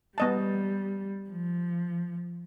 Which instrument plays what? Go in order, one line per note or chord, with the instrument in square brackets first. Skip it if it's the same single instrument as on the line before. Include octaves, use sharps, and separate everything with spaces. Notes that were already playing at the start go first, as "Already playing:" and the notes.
[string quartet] G3 [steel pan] B3 D#5 A5
[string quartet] F3